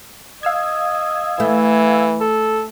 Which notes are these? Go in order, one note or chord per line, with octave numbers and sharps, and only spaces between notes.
D#5 F5 E6 G#6
E3 A3
A4